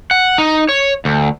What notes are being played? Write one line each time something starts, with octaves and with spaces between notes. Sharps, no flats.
F#5
D#4
C#5
D2